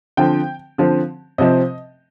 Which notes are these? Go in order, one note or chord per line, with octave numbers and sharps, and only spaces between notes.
D3 F3 C4 G5
D3 F3 C4
C3 F3 C4 D#5